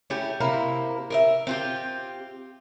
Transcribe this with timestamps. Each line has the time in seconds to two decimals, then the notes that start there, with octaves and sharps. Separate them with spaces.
0.10 A3 C#4 E4 G4
0.40 C3 A#3 E4 A#4
1.10 A#4 D#5 E5
1.47 C4 F4 G4